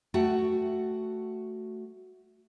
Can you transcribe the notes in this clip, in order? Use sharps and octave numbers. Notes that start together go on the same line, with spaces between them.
A3 F#4 F#5 G5